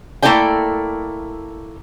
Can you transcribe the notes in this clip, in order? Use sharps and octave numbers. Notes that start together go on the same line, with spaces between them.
A3 A#3 E4 A4 D5 G5